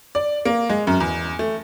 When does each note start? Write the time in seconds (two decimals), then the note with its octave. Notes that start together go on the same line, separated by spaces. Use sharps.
0.15 D5
0.45 A#3
0.70 G#3
0.87 F#2
1.00 E2
1.39 A3